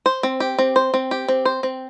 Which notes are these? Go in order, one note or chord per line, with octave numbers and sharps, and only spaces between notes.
C5
C4
G4
C4
C5
C4
G4
C4
C5
C4